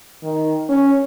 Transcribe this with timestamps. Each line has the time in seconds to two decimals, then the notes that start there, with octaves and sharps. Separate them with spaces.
0.23 D#3
0.69 C#4